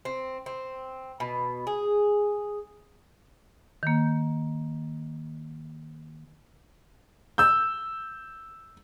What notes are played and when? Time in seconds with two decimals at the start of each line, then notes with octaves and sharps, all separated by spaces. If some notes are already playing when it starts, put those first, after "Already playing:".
0.05 C4
0.46 C4
1.20 B2
1.67 G#4
3.83 D#3 A#3
7.38 E6 G6